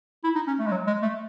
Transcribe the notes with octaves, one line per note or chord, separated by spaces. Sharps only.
E4
D#4
C#4
A3
G#3
F#3
G#3
A3